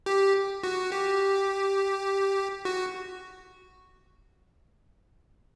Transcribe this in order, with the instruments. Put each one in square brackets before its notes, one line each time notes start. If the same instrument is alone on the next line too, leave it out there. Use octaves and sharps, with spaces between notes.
[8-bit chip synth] G4
F#4
G4
F#4